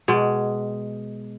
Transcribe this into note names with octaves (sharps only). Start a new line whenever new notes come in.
B2 G#3